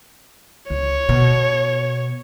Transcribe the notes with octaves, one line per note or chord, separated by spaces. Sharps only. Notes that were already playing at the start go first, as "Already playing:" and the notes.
C#2 C#5
B2